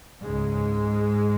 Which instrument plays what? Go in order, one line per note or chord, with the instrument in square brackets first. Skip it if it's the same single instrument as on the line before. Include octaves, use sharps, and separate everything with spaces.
[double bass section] C#2 G#2 C#3 G#3